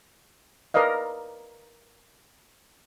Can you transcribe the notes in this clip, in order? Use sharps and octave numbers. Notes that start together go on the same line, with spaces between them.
A#4 B4 D5 D#5 F5